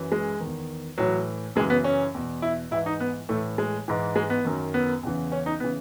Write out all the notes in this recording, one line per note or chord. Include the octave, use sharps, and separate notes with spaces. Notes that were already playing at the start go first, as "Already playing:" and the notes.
Already playing: F#2 E3
G#3
E2 D#3
A2 E3 F#3
F#2 C#3 E3 G#3
B3
C#4
E2 B2
E4
G#2 E3 E4
D#4
B3
A2 E3 A3
G#3
G#2 E3
G#3
B3
F#2 D#3
B3
E2 C#3 E3
C#4
D#4
C#3 E3 B3